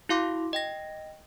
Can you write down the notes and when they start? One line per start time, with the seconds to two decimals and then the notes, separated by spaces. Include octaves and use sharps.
0.09 E4 F#4 F5 C6 D6
0.53 D#5 G5 A#6